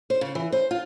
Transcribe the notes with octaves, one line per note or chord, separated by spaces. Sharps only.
C5
C#3
E3
C5
F4